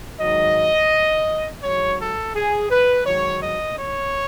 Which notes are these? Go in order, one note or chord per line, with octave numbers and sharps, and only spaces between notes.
G#2 D#3 F#3 D#5
G#2 F#3 C#5
A4
G#4
B4
G#2 D#3 F#3 C#5
D#5
C#5